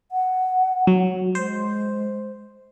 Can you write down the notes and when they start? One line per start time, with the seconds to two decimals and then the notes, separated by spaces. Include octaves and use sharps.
0.12 F#5
0.87 F#3
1.35 G#3 C5